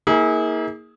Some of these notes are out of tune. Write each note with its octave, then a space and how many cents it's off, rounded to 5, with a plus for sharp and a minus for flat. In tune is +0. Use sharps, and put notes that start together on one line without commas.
A#3 +0 E4 -45 G#4 +0